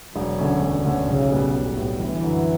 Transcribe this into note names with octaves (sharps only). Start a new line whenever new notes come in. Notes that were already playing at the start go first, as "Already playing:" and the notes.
E1 F#3
D2 D3 A3 C#4
E1
D2 D3 A3 C#4
B1 C#3
A2 G3 B3
B1
A2 G3 B3
G1 E3
F#2 D3 F#3